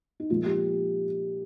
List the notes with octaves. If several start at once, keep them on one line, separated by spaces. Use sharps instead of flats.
D#4
A#2 F3 G#3 F4
G4